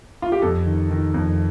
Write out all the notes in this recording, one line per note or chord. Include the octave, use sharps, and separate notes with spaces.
F4
G4
F2 A4
D#3
D#3
F2